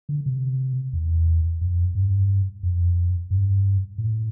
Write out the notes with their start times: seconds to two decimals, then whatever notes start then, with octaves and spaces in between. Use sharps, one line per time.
0.09 D3
0.26 C3
0.93 E2
1.61 F2
1.95 G2
2.63 F2
3.30 G2
3.98 A2